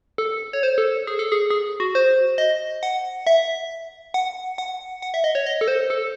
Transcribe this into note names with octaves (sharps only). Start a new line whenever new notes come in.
A4
C#5
C5
A4
G#4
A4
G#4
G#4
F#4
C5
D#5
F#5
E5
F#5
F#5
F#5
E5
D#5
C#5
D#5
A4
C5
A4